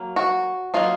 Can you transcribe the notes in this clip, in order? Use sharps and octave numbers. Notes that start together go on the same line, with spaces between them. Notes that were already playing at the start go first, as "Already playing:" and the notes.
Already playing: F#3 A#3
F#4
F#3 A#3 D#4 F4